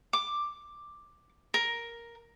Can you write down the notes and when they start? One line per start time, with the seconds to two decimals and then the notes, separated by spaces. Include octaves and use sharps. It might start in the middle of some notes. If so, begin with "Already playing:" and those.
0.13 D6
1.54 A#4